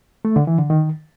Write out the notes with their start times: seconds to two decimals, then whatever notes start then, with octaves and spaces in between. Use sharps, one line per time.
0.25 A3
0.36 D3
0.47 E3
0.59 D3
0.70 D#3